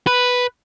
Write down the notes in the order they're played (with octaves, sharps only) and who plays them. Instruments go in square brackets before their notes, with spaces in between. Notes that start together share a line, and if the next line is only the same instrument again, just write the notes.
[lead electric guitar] B4